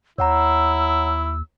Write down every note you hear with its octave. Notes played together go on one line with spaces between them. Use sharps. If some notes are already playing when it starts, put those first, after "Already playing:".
D#2 E4 C#5 F#5 A#5 E6